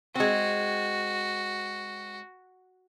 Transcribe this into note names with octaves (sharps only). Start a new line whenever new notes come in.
G#3 C4 F#4